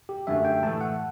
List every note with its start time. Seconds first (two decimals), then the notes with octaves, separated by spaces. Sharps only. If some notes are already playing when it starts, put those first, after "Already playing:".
0.09 G4
0.27 F#2 D3 A3 E5
0.45 G5
0.63 A2 E3 A3 A5
0.81 F#5